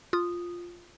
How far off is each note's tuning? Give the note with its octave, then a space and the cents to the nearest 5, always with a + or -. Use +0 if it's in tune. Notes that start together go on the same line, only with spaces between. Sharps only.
F4 +0 D#6 -10